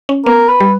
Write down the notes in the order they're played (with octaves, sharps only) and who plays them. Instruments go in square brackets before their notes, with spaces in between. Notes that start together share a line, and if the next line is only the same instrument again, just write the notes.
[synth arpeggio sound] C#4
[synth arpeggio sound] B3 [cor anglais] A#4
[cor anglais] B4
[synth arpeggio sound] G3